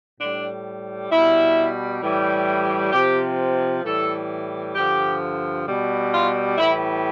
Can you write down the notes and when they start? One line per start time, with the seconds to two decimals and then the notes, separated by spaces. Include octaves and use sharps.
0.19 A2 G3 D4
1.11 B2 G3 E4
2.02 A2 E3 G3
2.92 C3 F3 G4
3.83 A2 E3 G3 A4
4.75 G2 D3 F3 G4
5.66 B2 G3
6.12 F4
6.57 A2 E3 G3 E4